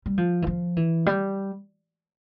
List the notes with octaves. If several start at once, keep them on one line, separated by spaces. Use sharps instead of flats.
G3
F3
E3
F3
E3
G3